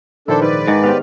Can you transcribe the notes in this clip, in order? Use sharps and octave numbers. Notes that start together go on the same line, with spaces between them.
A#1 D#3 D4 E4 A4 C5
G#2 B4 D5
G#2 D#3
B3 G4 C5 F5